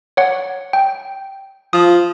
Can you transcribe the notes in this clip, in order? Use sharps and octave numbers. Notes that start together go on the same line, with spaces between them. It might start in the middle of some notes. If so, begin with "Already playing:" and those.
C#5 F#5
G5
F3 D#6